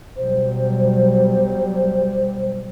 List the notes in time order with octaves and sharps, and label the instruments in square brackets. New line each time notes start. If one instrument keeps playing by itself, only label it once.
[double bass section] B2 F#3 G3 [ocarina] C5